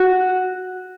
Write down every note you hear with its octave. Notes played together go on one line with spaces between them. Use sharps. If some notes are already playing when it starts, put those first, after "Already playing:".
Already playing: F#4